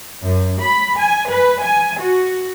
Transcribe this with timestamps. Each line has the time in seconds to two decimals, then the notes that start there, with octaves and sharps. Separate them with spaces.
0.24 F#2
0.61 B5
1.00 G#5
1.30 B4
1.64 G#5
2.03 F#4